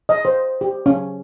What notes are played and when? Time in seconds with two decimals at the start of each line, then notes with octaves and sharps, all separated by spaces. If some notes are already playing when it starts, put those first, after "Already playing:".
0.09 D#5
0.25 C5
0.61 G4
0.86 C#4